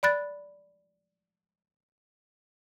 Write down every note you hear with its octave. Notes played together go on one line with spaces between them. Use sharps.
D5 B5 F#6 A6